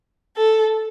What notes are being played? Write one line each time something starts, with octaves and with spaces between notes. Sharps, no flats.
A4